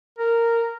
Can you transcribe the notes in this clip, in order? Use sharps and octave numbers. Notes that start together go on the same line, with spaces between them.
A#4